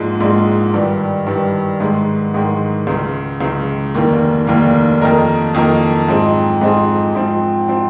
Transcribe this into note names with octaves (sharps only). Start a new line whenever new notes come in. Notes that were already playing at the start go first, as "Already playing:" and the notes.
Already playing: A#1 G#2 F3 G#3
A#1 G#2 F3 G#3
G2 D#3 G3
G2 D#3 G3
G#2 D#3 G#3
G#2 D#3 G#3
C#2 C#3 G#3
C#2 C#3 G#3
F1 D#2 D#3 A#3
F1 D#2 D#3 A#3
F2 D#3 A#3 D#4 A#4
F2 D#3 A#3 D#4 A#4
G#2 F3 C4 D#4 G#4
G#2 F3 C4 D#4 G#4
G#2 F3 C4
F3 C4